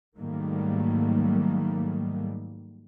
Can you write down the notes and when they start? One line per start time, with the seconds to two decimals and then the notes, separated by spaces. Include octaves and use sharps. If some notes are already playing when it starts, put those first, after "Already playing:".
0.17 G#2 D#3 F#3 G3 A3 A#3